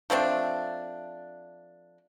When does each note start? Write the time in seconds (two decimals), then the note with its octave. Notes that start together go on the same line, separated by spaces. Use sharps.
0.10 F3 A3 C4 D4